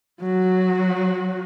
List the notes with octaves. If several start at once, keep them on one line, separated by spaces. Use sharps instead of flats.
F#3 F#4